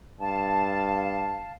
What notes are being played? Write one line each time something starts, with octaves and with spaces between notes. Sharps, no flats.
G2 F5 A5